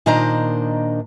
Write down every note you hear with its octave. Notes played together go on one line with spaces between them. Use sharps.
A#2 D#3 D4 C5 D#5 A#5